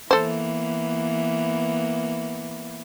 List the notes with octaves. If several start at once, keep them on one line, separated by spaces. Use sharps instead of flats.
E3 A#3 B3 A4 C5